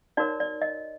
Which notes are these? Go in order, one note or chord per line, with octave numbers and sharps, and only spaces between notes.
D#4 F#4 A#4 C#5 D5
D5
D#5